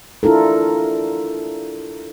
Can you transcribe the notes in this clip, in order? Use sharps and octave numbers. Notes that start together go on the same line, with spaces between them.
D4 E4 F4 A4 A#4